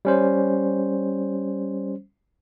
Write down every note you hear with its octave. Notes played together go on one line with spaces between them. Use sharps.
G3 C#4 C5